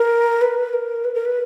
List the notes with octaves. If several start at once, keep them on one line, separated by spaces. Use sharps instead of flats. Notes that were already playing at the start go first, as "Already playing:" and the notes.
Already playing: A#4
B4
A#4
B4
A#4
B4